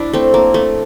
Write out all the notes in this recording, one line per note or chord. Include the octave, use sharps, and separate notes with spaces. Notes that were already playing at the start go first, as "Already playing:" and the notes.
Already playing: D4 E4
A3 C4
A#3
A3